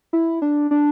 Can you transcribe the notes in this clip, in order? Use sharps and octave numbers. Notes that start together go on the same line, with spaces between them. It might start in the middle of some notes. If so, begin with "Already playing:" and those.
E4
D4
D4